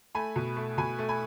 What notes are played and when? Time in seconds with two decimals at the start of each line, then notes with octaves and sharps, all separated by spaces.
0.15 A3 G#5 B5
0.36 B2
0.57 A3
0.78 B2 G#5 B5
0.99 A3
1.09 G#5 B5